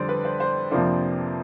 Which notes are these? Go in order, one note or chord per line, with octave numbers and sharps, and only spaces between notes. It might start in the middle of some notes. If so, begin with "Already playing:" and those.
Already playing: F2 D3 G3 C5 D5
B4
C5
C5
F2 C3 F3 A#3 D4 C5